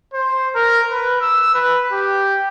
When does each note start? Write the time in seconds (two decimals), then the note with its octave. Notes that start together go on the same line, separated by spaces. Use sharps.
0.13 C5
0.55 A#4
0.91 B4
1.21 E6
1.54 B4
1.92 G4